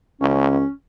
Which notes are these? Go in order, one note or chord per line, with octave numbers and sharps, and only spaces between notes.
C#2 C#4